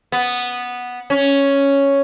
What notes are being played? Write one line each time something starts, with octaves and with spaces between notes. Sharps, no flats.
B3
C#4